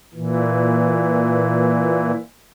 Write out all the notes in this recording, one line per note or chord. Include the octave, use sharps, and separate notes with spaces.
A#2 E3